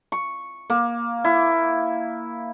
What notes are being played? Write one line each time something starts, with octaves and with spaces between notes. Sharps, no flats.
C#6
A#3
E4